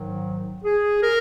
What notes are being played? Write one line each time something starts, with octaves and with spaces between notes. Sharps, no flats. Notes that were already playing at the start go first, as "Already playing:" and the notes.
Already playing: G#2 D#3 F#3
G#4
A#4